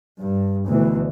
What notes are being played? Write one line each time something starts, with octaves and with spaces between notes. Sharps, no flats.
G2
D2 B2 E3